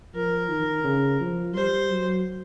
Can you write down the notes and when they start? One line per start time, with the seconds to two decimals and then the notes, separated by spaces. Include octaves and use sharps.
0.15 F3 A#4
0.49 D#3
0.84 C#3
1.21 F3
1.55 G3 C5
1.90 F#3